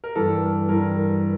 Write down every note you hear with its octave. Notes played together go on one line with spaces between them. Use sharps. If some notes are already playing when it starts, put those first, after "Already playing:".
A#4
G2 E3 A4
G2 E3 A#4
A#4